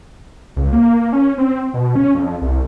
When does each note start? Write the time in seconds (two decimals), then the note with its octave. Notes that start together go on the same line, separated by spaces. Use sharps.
0.56 C#2
0.73 A#3
1.13 C#4
1.38 C4
1.74 B2
1.95 C#4
2.14 F2
2.41 C2